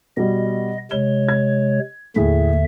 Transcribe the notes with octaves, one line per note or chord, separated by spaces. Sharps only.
B2 G3 D#5
C3 G#3 C#5 G7
G#6
D#2 A2 D3 G#4 E5